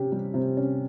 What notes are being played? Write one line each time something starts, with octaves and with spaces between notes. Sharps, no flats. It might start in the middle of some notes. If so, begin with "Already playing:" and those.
Already playing: C3 C#4 G4
G3
C3
C#4